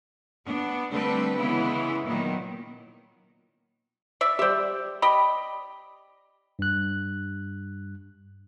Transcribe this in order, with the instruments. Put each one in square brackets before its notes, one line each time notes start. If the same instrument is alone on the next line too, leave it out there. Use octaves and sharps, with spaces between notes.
[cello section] B3 D4
D3 G3 A3 C4 A4 B4
C#3 E3 G#3 B3 E4
A#2 D#3 F#3 B3
[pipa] D5 E5
[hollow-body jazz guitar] G4 D5 [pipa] C5 E5
[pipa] G4 D5 D#5 [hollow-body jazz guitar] B5
[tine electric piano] G2 F#6